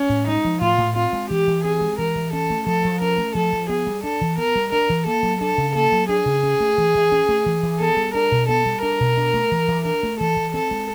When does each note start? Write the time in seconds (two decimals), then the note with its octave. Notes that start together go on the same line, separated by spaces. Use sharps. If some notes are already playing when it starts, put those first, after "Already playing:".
Already playing: C#4
0.09 A2
0.28 G#3 D#4
0.45 F3
0.61 A2 F4
0.78 A2
0.96 C4 F4
1.13 G#3
1.30 E3 G4
1.47 E3
1.64 C4 G#4
1.81 G#3
1.98 E3 A#4
2.15 E3
2.33 C#4 A4
2.50 A3
2.66 F3 A4
2.84 F3
3.01 C#4 A#4
3.18 A3
3.35 F3 A4
3.53 F3
3.69 B3 G#4
3.87 G3
4.04 D4 A4
4.21 E3
4.38 B3 A#4
4.56 G3
4.72 D4 A#4
4.89 E3
5.06 A#3 A4
5.23 F#3
5.41 D4 A4
5.58 C#3
5.75 A#3 A4
5.92 F#3
6.09 D4 G#4
6.26 C#3
6.43 C#4
6.60 A3
6.78 E3
6.95 E3
7.12 C#4
7.29 A3
7.46 E3
7.63 E3
7.80 B3 A4
7.97 G3
8.14 D4 A#4
8.31 B2
8.48 B3 A4
8.66 G3
8.82 D4 A#4
9.00 B2
9.17 D4
9.34 A3
9.51 E3
9.68 E3
9.85 D4 A#4
10.03 A3
10.20 E3 A4
10.36 E3
10.54 C4 A4
10.71 G#3